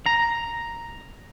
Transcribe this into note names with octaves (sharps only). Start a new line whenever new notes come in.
A#5